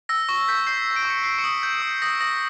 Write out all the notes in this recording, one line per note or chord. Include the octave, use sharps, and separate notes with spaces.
E6 A#6
C#6 A#6
G6 B6
G6 C7
E6
D7
C#6
C#7
G6 C7
C#6 C#7
D#6
G6
D#6
D#6 A#6
D#6 A#6